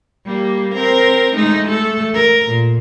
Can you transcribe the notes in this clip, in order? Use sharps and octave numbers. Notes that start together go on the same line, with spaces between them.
G3 A#3
C4 A#4
G#3 A3 D#4
A3 A4
A#4
A#2